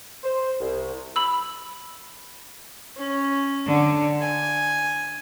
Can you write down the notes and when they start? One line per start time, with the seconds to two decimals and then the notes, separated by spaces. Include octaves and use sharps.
0.23 C5
0.60 C2
1.16 B5 E6
2.98 C#4
3.66 D3
4.21 G#5